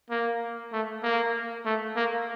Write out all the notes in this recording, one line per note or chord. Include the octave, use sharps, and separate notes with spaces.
A#3
A3
A#3
A3
A#3